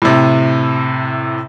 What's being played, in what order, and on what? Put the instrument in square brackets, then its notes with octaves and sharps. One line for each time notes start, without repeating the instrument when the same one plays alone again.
[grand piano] A2 C3